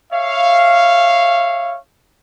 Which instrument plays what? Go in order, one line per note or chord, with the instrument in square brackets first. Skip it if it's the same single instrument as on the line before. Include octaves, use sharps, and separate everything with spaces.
[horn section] C#5 E5 F5